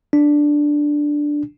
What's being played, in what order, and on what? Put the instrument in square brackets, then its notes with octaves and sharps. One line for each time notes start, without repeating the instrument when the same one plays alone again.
[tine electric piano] D4